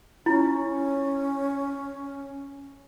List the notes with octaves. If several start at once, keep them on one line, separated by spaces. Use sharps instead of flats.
C#4 E4 F4